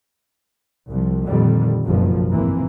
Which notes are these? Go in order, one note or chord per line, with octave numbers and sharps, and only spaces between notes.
C2 F3
F2 A#2 D3 D#3 G3
F#1 B1 G2 F3
F1 G#2 E3 A#3 C4